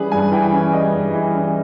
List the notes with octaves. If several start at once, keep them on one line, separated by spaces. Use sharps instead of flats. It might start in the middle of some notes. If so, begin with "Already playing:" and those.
Already playing: E3 G3 C#4 G#4 B4
G2 G#5
E3 G5
C#4
G3 D#5
G2
E3
C#4